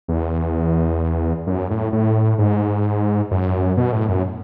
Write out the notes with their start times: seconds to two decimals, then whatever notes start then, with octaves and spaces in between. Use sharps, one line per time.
0.08 E2
1.47 F#2
1.70 A2
1.92 A2
2.38 G#2
3.31 F#2
3.77 B2
3.92 A2
4.09 F#2